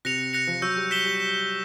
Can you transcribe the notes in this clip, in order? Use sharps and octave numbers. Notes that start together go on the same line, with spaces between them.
C3 F#6 A#6 C#7 F7
F#6 A#6 C#7 F7
F3
F#3 C#6 E6 G6
G3
G6 B6 E7 G7
G3